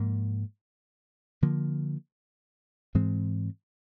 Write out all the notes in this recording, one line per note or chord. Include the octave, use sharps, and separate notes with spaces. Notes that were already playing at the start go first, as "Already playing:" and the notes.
Already playing: G#2 F3 A#3
D3 F3 A#3
G#2 E3 G#3 C4